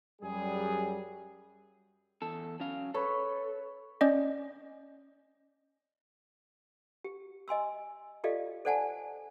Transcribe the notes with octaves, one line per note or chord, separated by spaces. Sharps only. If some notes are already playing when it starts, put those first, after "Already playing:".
F#2 G3 G#4
E2 A4
F#3 C#4 F5
A4 B4 C#5 B5
C#4 D5 D#5
G4
D#5 G#5 C6 E6
F4 G4 A4 D5 D#5 F5
A4 C5 D5 F#5 G#5 A5